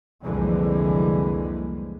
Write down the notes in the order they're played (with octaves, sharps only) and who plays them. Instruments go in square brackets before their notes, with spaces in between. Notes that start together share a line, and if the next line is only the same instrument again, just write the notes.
[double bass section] C2 F2 D3 E3 G#3 A#3